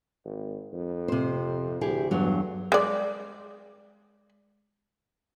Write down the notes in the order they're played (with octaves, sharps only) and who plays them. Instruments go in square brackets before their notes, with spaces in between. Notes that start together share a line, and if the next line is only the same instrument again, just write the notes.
[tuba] G#1
F2
[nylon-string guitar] C3 C5
[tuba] D2 [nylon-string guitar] E4 G4 G#4
[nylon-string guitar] E2 G2 F#3
[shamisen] G#3 D5